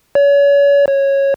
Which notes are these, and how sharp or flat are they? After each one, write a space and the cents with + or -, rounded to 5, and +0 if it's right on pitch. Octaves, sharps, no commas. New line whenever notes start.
C#5 +35
C#5 -10